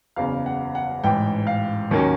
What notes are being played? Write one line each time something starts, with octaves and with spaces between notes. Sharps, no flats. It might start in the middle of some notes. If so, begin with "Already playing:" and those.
F#1 E2 C#3 F5
F#5
F#5
A1 G#2 E3 G5
F5
D#2 D#3 F#3 A#3 C#4